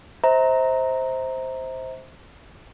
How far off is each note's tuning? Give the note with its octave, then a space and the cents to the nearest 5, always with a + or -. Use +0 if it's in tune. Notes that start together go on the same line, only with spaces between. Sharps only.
C5 +0 E5 -40 A#5 +0